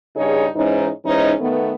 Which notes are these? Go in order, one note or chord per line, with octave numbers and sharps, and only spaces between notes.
G2 C#3 D#4 G#4 C#5
G#2 E3 C#4 D#4
G#2 E3 C#4 D#4
D#3 A3 B3